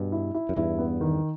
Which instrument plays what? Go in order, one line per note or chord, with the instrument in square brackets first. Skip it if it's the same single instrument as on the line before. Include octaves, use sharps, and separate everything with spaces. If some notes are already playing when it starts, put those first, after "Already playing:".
Already playing: [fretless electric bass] G2 B2
[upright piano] E4
E4
[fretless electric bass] F#2
[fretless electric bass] E2 G2 [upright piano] E4
[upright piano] B3
D#3